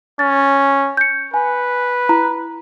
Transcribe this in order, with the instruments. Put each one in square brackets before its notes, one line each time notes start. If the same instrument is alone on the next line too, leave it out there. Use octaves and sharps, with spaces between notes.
[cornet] C#4 [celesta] A6
[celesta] G6 C#7
[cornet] B4 [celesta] G#5
[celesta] E4 A#5